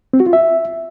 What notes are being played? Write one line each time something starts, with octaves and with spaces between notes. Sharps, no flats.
C4
F#4
F4
E5